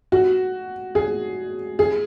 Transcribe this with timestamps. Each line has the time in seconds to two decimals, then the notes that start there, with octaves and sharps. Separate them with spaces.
0.12 F#4
0.95 G#4
1.79 G#4